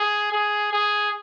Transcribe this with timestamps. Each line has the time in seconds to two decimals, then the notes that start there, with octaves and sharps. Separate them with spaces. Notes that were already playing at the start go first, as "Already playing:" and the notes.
Already playing: G#4
0.32 G#4
0.73 G#4